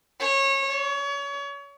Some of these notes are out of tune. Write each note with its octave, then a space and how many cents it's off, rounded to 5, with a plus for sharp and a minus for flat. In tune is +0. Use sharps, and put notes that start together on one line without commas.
C#5 -25
C#5 +30